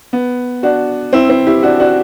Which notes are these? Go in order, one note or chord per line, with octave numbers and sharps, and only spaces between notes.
B3
D4 F#4
C4 E4
C4 E4
E4 G4
D4 F#4
D4 F#4